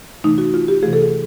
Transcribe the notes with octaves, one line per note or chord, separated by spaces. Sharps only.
C3 E3 A3 D#4
F#4
F4
G4
C3 E3 A3 G#4
A4
G#4